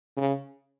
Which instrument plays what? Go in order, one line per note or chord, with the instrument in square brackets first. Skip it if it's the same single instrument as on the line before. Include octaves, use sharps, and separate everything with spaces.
[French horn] C#3